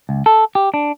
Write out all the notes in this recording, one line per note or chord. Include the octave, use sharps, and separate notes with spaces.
C#2
A4
G4
D4